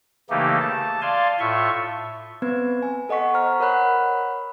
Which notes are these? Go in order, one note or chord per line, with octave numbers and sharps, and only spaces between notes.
C#3 E3 A3 A#3 D#4 G4
A5
D5 F5 G#5 C6
A2 F4 E5 C#6
B3 C4 B4 G#6
G#5
A4 D#5 F#5 C#6 B6
C5 A#5 C#6 F6 B6
A#4 C#5 F#5 B5 F#6